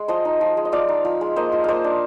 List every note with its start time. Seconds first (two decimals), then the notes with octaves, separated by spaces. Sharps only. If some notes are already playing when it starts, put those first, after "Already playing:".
Already playing: G#3
0.08 F3 C5 D#5
0.25 D#4
0.41 F3
0.57 G#3
0.65 D#5
0.72 F3 D5 F5
0.89 D#4
1.05 F3
1.21 G#3
1.36 A#3 C5 D#5
1.52 F4
1.64 A#3 C5 D#5 F5
1.84 D4